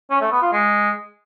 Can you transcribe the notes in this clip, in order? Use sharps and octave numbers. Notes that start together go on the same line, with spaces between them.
C#4
A3
B3
F4
G#3